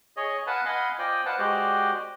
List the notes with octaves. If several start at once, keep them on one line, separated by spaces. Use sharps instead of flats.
G#4 C#5 D#5
B4 F5 F#5 G#5 A5 B5
D#5 F5 F#5 G#5 B5 C6
F4 C5 D5 D#5 G5 G#5
B4 C5 F5 F#5 A5
G#3 F#4 G4 C5 D5 D#5